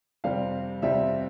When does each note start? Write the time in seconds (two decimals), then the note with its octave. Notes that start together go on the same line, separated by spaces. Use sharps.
0.24 F2 C3 G3 C4 F5
0.82 F2 C3 G3 C4 E5